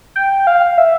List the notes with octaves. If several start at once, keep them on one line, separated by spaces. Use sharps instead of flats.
G5
F5
E5